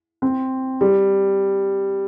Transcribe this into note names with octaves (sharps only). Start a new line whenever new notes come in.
C4
G3